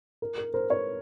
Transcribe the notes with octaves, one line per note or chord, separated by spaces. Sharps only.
A#4
A#4
A#4 C5
B4 C#5